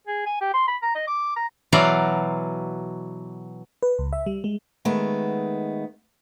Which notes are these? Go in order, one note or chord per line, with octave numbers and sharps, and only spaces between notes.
G#4
G#5
G4
C6
B5
A#5
D#5
D6
A#5
B2 E3 F#3 D5 F5 A#5
B4
C#2
E5
G3
G#3
D#3 G#3 A3 B3